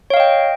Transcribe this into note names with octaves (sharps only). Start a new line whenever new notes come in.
C#5 D#5 F5 G5